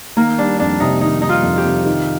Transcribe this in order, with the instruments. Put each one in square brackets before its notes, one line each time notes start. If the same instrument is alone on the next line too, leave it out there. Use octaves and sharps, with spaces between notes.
[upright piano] D#3 [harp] A#3
[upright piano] G3 [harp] D4
[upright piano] F2 [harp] D4
[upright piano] C3 [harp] D#4
[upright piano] D#3 [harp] D#4
[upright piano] G3 [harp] D#4
[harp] F4
[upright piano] F2
[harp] G4
[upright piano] C3
D#3